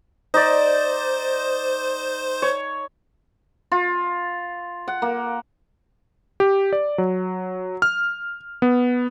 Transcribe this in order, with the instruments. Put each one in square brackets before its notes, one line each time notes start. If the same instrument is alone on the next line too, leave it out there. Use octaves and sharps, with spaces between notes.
[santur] D#4 D5 [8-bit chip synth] C5
[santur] C#5
[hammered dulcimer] F4
F#5
A#3
[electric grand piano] G4
D5
F#3
F6
B3